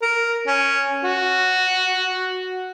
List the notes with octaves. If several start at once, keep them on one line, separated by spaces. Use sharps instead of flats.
A#4
C#4
F#4